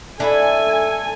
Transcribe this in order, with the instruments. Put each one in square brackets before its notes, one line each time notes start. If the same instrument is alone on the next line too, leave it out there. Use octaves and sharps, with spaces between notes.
[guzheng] A3 E4 B5 [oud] D4 [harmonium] A4 [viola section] G#5